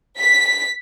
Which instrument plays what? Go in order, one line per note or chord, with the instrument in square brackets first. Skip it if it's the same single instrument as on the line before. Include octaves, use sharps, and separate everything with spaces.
[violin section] B6